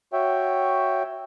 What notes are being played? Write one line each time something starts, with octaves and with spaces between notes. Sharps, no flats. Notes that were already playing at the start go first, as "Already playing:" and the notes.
F#4 C#5 E5 G5